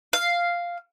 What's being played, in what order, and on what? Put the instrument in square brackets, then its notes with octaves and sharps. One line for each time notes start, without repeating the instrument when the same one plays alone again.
[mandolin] F5